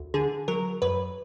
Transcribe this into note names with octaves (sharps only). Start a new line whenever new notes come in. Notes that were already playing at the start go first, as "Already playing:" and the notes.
Already playing: D2
D3 G#4
F#3 A#4
F#2 B4